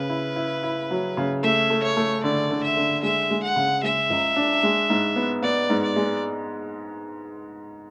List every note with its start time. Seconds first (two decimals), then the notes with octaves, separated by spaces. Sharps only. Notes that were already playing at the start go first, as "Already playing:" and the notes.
Already playing: C#3 B4
0.10 E4
0.36 E4
0.63 E4
0.91 F#3
1.17 C#3
1.43 A3 E5
1.70 A3
1.83 C#5
1.97 A3
2.24 D3 D5
2.51 D3
2.63 E5
2.77 D3
3.03 G#3 E5
3.31 G#3
3.43 F#5
3.56 C#3
3.83 G#3 E5
4.10 C#2
4.36 D4
4.63 G#3
4.90 G#2
5.16 B3
5.42 B3 D5
5.70 G#2
5.83 D5
5.96 G#3